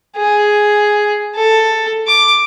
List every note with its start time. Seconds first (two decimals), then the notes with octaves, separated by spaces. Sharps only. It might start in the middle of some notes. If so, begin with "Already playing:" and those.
0.17 G#4
1.36 A4
2.07 D6